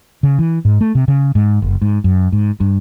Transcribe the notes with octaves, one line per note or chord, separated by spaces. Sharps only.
C#3
E3
G#2
A3
C3
C#3
G#2
F#1
G#2
F#2
G#2
G2